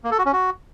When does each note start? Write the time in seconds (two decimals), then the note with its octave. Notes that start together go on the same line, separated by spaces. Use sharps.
0.04 A#3
0.11 A4
0.18 F#4
0.26 C#4
0.33 F#4